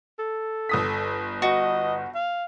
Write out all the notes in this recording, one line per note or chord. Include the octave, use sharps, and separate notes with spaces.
A4
G1 D#6 B6
F#4 D#5
F5